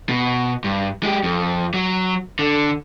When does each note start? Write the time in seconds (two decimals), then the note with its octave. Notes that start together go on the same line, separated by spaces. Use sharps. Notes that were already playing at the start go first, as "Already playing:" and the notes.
0.09 B2
0.64 G2
1.03 G#3 G4
1.23 F2
1.74 F#3
2.39 D3